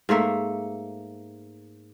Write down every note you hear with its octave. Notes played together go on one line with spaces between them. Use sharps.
G#2 A3 A#3 E5